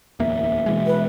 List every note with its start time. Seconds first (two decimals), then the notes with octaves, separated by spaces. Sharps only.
0.20 D1 E2 A#3 E5
0.66 B2 E3 G#3
0.87 B4